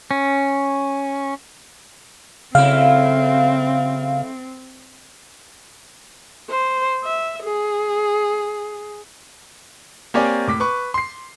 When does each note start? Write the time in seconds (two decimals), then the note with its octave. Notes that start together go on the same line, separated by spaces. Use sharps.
0.11 C#4
2.55 C#3 F#3 A3 C4 E4 F5
6.50 C5
7.04 E5
7.43 G#4
10.14 A#3 C4 G4 C#5 D5 G#5
10.47 A2 D6 B6
10.60 B4 C#6
10.94 C6 C7